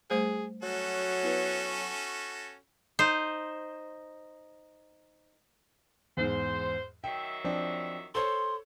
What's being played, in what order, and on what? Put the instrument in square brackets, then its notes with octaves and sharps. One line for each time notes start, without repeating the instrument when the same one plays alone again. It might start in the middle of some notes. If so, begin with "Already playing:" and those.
[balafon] G3 A3 C5 [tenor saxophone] G#4
[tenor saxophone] F#3 [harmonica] C#4 F#4 A4
[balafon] B3 E4 B4
[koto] D#4 C5
[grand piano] E2 G#2 [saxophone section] C5
[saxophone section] D#3 F#3 E5 [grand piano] G5
[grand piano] F3 C4 D4
[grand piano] A4 C5 C#5 [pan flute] C6